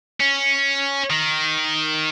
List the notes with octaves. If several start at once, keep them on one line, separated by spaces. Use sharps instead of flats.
C#4
D#3